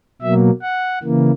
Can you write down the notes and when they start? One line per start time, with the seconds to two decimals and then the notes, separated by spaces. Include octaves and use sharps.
0.22 B2 F#3 A#3 E5
0.62 F#5
1.03 C#3 E3 A#3